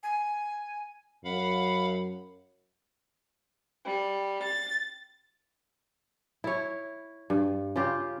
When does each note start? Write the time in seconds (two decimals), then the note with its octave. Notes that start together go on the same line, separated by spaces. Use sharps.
0.03 G#5
1.24 F#2 F5 F#5 B5
3.85 G3
4.42 A6
6.44 E4 C#5
7.30 G2
7.76 C#3 F4 G4